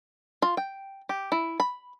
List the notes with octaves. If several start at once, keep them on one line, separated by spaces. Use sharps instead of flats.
F4
G5
G4
E4
B5